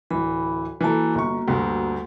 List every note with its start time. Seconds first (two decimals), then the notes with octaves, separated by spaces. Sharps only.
0.11 D1 E3 B5
0.81 E3 A#3 F#4 A4 A#5
1.15 G1 C#6
1.48 D2 G2